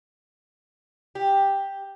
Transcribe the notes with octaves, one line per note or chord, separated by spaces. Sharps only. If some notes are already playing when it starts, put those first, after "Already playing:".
G4